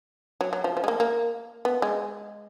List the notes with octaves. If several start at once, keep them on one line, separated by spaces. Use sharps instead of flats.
F#3
F#3
F3
F3
G#3
A#3
A#3
B3
G#3